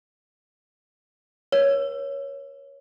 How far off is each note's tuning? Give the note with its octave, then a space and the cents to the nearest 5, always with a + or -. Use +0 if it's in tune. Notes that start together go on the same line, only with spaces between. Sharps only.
A#4 +45 C#5 +0